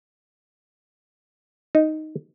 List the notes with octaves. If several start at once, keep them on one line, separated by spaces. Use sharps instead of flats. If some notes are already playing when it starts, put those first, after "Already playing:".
D#4